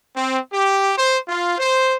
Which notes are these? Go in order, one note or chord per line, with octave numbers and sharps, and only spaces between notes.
C4
G4
C5
F4
C5